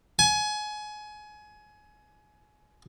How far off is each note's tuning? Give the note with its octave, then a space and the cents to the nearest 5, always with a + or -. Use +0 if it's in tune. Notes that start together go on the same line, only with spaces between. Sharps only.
G#5 +25